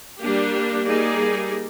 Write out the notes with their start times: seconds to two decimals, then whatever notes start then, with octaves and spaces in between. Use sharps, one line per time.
0.21 G3 A#3 D4 G4
0.86 G3 A#3 D#4 G#4 D5